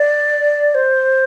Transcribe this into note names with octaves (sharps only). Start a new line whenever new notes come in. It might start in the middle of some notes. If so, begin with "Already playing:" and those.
Already playing: D5
C5